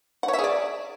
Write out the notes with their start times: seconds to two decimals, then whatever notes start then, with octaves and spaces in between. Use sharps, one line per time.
0.23 F#5
0.28 C#5
0.33 E5
0.39 G#4
0.44 D5